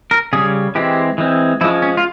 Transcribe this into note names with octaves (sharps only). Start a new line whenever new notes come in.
A#4
C#3 G3 C#4 G#4
E3 G#3 C4 G4
E3 G#3 C4
F3 G#3 C#4 E4
C#4
F4